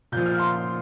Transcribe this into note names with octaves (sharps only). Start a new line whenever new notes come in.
A#2 F3 G6
F6
C6